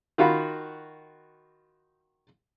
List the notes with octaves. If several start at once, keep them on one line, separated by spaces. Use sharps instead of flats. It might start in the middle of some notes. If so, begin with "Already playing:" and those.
D#3 F4 F#4 B5